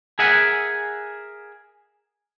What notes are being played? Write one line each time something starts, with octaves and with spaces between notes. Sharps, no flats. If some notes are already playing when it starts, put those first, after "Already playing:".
G#4 A#4 E5 F#5 G#5